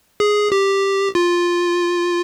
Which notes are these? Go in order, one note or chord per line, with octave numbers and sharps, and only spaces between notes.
G#4
G4
F4